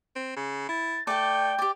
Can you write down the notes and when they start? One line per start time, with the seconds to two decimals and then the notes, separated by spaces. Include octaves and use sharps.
0.16 C4
0.36 C#3
0.69 E4 A6
1.07 A3 D5 G5 A5
1.59 G4 D5